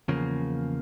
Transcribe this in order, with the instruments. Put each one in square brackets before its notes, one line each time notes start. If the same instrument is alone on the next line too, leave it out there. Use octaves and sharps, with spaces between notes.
[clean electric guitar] E2 C#3 F3 A#3